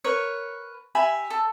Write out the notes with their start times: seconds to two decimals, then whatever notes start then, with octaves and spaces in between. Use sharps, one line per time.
0.04 A#4 B4 C#5
0.95 G4 E5 G#5 B5
1.30 A4